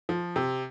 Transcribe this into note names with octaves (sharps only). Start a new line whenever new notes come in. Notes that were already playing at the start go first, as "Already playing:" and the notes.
F3
C3